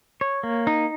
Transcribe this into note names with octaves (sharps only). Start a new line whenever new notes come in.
C#5
A#3
D#4